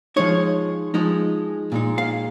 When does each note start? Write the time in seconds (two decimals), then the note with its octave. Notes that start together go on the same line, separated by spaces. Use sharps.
0.16 F3 G#3 D#4 C#5
0.94 F3 G#3 D#4
1.72 A#2 G#3 D#4
1.98 F5